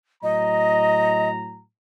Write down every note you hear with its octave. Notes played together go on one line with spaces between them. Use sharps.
A2 F#3 D#5 A#5